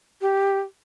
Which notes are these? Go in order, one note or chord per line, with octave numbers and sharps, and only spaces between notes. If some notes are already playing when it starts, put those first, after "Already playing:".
G4